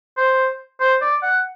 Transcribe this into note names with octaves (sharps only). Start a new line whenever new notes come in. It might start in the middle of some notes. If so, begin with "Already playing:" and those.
C5
C5
D5
F#5